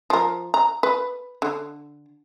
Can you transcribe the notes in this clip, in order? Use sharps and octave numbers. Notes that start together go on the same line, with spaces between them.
F3 A#4
A#5
B4
D3